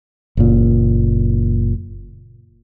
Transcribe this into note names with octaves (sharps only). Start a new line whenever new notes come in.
F#1 A#2